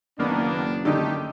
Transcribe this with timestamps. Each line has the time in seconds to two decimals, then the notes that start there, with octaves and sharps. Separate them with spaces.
0.19 F#1 D#3 A#3 B3 D4
0.85 D3 D#3 A3 D#4 G4